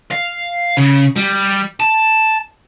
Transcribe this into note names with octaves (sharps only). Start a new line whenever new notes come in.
F5
C#3
G3
A5